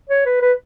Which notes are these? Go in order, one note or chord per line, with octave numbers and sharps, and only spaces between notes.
C#5
B4
B4